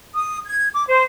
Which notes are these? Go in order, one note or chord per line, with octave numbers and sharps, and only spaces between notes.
D#6
G#6
D6
C5